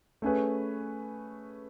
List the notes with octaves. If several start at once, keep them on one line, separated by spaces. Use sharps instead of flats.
A3 C#4 G#4 B4